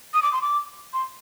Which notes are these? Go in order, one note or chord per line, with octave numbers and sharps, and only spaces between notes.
D#6
D6
C6
D6
C6